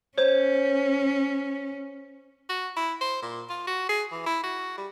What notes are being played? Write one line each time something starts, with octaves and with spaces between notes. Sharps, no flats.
C#4 C5 C#5
F#4
E4
C5
A#2
F4
F#4
G#4
E3
E4
F#4
G3